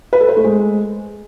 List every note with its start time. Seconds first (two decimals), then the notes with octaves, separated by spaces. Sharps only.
0.13 B4
0.21 A4
0.29 C5
0.36 A3
0.44 G#3